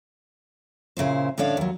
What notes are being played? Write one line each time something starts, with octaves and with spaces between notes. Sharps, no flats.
A#2 C#3 E4 C5
A2 D3 C#4 D4 C#5 F5
D#2 F#3